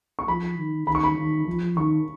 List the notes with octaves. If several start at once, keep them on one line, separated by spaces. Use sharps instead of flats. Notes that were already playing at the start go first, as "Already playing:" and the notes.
C#6
F3 B5
D#3
D#3 B5
C#6
B5
D#3
F3
D#3 C#6